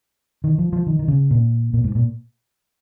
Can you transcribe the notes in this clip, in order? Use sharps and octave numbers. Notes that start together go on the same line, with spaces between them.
D#3
F3
F3
D#3
D#3
C#3
A#2
A#2
G#2
A#2